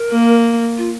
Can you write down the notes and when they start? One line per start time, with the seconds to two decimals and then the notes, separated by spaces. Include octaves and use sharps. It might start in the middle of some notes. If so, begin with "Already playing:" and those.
Already playing: A#4
0.11 A#3
0.78 F4